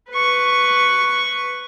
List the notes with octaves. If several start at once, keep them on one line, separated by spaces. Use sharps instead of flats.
B4 C#6